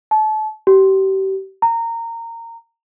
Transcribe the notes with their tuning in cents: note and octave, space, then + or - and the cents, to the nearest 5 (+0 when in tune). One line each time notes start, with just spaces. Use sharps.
A5 -30
G4 -35
A#5 -20